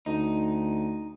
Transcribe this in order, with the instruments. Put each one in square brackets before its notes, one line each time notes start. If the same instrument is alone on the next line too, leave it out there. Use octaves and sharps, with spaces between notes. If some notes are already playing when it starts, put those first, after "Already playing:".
[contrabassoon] D2 [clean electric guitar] D#4